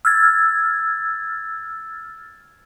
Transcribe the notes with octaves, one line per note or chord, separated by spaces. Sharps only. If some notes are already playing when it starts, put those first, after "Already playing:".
E6 F6 G#6 A6